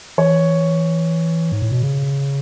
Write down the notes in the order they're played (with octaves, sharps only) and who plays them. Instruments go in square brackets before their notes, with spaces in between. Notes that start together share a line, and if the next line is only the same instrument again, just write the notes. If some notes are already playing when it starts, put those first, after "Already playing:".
[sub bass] E3 [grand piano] C#5
[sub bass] G#2
A2
B2
C#3